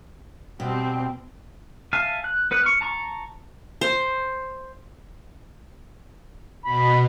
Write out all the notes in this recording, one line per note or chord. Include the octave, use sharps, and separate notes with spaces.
B2 G3 C4 G5
E5 F5 G#5 A5 F6
F#6
B3 B4 F#6
C#6 F6
A5 A#5 C#6
C5
B2 B5